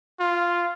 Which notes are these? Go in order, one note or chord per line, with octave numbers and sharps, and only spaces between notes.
F4